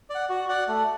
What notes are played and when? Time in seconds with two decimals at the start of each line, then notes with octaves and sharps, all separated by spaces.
0.10 D5 F#5
0.29 F#4
0.49 D5 F#5
0.68 A3